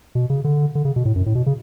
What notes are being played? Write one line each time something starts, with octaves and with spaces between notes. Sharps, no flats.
B2
C#3
D3
D3
C#3
B2
A2
F#2
A2
B2
C#3